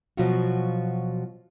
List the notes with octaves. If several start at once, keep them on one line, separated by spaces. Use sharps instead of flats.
B2 F3 F#3 F4 F#4